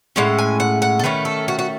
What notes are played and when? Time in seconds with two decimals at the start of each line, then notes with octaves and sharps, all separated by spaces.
0.16 A2 G#3 C#4 F#5
0.38 G#5
0.60 F#5
0.82 F#5
0.99 A4
1.04 D#3 A3 C#4 B4
1.25 A4
1.48 F#4
1.59 F#4